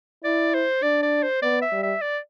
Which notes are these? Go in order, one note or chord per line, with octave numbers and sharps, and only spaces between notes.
E4 D5
C5
D4 D5
D5
C5
B3 D5
E5
G3
E5
D5